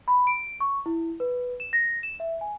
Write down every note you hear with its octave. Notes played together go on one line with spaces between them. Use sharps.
B5
D7
C#6
E4
B4
E7
A#6
E7
E5
G#5